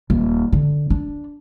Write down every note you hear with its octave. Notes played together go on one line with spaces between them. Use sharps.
D#1
D3
D4